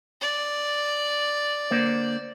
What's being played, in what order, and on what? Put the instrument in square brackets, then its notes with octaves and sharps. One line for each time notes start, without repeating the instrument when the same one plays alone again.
[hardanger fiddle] D5
[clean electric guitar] D3 A#3 C5